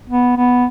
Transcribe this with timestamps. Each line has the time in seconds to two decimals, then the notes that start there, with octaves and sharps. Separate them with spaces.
0.10 B3
0.37 B3